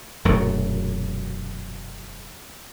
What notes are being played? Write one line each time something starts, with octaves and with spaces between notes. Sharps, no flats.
E1 F#2 A#2 A3